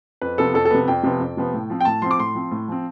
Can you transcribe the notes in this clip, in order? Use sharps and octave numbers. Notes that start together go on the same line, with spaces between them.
F2 B4
C3 F3 B3 A4
F2 A4
A4
C3 F3 B3
F2 G5
C3 F3 B3
F2
C3 F3 B3
A2
F3 C4
G5
A2 A5
F3 C4 C6
D6
A2 C6
F3 C4
A2
F3 C4